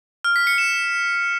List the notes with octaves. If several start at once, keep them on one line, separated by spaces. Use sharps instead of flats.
F6
B6
C#7
E7